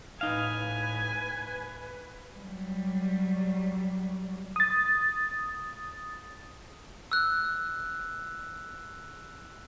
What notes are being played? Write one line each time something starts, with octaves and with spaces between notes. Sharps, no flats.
A2 D#4 B4 F5 G#5
F#3 G3
D#6 A6
E6 F#6